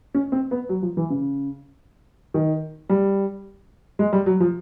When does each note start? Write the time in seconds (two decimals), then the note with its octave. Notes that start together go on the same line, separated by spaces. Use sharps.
0.14 C#4
0.32 C4
0.51 B3
0.69 F#3
0.82 F3
0.97 E3
1.10 C#3
2.34 D#3
2.89 G3
3.99 G#3
4.13 G3
4.26 F#3
4.40 F3